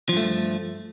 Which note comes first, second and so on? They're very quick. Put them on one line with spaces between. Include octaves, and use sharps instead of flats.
F3 G2 A3